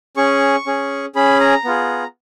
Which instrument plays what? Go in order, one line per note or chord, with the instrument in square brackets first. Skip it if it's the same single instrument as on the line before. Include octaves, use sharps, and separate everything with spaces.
[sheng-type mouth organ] C#4 G#4 C#6
C#4 G#4
C#4 G#4 B5
A#5
B3 F4 G#4